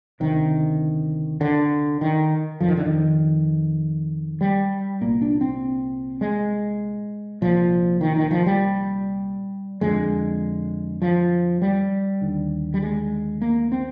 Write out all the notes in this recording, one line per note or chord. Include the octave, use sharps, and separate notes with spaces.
D2 C3 D#3
D3
D#3
F2 D3 F3
D#3
D3
D#3
G3
C2 A#2 A#3
D4
C4
G#3
C2 A#2 F3
D#3
D#3
F3
G3
F2 D3 G#3
F3
G3
D#2 D3
G3
G#3
A#3
C4